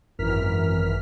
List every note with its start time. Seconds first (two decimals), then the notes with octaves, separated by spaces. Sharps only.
0.19 G#1 F#2 E3 A#4 F6 B6